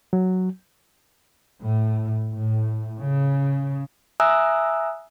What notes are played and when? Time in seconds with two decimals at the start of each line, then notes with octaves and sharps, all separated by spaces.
0.13 F#3
1.61 A2
2.32 A2
2.99 C#3
4.20 E5 G#5 A#5 D#6 E6 F#6